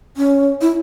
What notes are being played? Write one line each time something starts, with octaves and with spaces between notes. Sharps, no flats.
C#4
E4